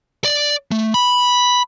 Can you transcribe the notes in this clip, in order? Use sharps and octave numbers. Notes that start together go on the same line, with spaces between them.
D5
A3
B5